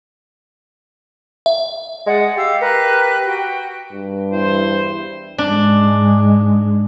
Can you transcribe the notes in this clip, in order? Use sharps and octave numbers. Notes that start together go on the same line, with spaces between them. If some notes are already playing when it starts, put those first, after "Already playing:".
E5
G#3 D5 D#5 F#5
G4 F5 E6
A#4 B4 F#6
F#4 G5
G2
E2 E4 C5
G#2 G#3 D4